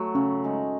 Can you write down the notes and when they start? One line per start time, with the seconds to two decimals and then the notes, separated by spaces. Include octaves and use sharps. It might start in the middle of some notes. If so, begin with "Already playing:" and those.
Already playing: F#3 A3
0.15 C#3 C#4
0.44 G#3 D#4